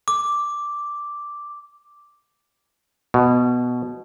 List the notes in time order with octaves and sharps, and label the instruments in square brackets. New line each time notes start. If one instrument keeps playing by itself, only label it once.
[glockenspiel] D6
[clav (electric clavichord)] B2